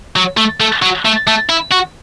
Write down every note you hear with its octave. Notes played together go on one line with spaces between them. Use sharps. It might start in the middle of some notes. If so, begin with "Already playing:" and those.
F#3
A3
A3
F#3
A3
A3
E4
F#4